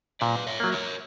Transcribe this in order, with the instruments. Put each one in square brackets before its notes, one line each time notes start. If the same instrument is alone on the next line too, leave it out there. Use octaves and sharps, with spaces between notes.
[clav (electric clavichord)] A#2 [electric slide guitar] B4 D5
[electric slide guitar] C#5 E5
[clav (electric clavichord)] F#3 A#3
[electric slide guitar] A#4 C#5